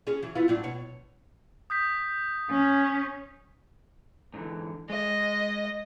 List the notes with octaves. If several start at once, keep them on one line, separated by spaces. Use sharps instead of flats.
C#4 G#4
E3 F#3
B3 E4 F4
A2 F#3 D4
B2 C#5
D#6 G6 B6
C#4
G#2 D3 E3
G#3 D#5